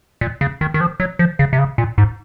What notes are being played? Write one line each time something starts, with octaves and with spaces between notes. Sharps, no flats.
A#2
C#3
D#3
D#3
F3
F#3
F3
C#3
C3
C#3
A#2
G#2